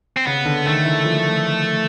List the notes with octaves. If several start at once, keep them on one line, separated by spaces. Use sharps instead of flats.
C4
C#3 B3
D3
D#3 A3
E3
F3